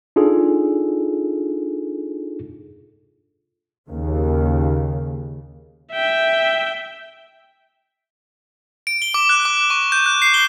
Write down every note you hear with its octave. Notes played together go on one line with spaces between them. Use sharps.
D4 D#4 F4 G#4 A4
D#2 C#3
E5 G5
D7
G7
D6
F#6
D6
C#6
G6
F#6
C7
G7